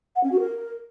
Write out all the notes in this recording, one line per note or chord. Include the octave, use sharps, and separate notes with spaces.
F#5
C#4
F#4
A#4